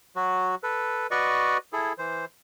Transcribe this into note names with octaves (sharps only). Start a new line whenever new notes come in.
F#3 F#4
A4 B4
F#4 B4 D5 D#5 C#6
E4 G#4 A4
E3 C5